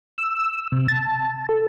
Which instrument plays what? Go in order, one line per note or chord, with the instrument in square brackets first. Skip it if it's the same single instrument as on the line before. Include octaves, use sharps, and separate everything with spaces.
[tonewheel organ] E6
C3
A5
A4